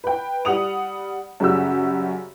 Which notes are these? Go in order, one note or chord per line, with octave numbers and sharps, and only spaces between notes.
B4 G5
G3 F#5 D#6 F7
F#2 C#3 G3 F#4 G4 E6